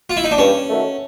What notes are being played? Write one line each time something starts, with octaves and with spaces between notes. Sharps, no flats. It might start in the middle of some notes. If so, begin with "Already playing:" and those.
F4
E4
D#4
D4
G2 C#4
D#3 F#3 A3